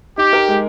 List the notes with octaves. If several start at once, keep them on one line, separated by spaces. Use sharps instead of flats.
D#4 G4
A#4
G#3